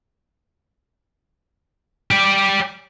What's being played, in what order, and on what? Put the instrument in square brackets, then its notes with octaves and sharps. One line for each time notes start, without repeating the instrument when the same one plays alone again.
[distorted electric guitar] G4 D5